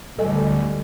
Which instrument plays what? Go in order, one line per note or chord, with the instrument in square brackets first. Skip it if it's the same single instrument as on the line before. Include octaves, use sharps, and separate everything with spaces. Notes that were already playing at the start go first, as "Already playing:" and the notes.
[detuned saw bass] D1 [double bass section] D2 D3 G3 [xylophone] A4 D#5 G#5